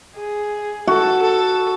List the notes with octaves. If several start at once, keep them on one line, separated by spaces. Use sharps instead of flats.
G#4
F#4 A4
A4